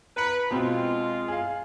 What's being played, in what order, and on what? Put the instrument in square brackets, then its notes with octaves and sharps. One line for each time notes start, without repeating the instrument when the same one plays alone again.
[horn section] B4 [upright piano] A#5 C#7
[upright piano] B2 C4 [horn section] G#3 F4
[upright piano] G#4 F5